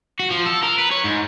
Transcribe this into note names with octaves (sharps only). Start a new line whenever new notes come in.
F#4
F3
A4
A#4
B4
C#5
G#2